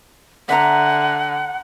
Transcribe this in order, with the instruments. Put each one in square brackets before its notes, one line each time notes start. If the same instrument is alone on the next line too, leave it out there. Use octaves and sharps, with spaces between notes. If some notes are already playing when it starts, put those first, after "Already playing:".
[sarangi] D3 [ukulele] E5 A#5 [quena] F#5